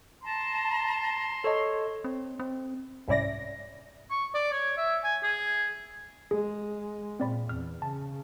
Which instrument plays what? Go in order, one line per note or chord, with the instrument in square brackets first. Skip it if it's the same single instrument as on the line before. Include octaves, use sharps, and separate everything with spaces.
[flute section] A5 A#5 [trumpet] C6
[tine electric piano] A4 D#5 [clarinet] C#5
[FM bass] C4
C4
[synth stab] C2 G#2 C#4 E4 D5 A#6
[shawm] C#6
D5
C#5
E5
G#5
G#4
[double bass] G#3 [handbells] G#4
[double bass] A#2 [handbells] C4 D5 B5
[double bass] E2 [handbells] F6
[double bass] C#3 [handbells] A5